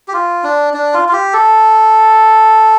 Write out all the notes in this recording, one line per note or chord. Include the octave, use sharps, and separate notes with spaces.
G4
F4
D4
D4
F4
F4
G4
A4